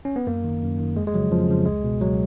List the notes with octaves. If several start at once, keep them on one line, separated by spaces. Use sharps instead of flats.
C#4
B3
F#2 A#3
D#3
F#2
D#3
F2 G#3
G#3
C#3 F3 F#3
F2 F3
C#3 F3
C#2 G#3
B2
C#2 F#3